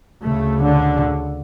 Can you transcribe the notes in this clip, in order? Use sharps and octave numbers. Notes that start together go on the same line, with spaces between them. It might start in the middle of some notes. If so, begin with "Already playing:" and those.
D2 C#3 A3
D3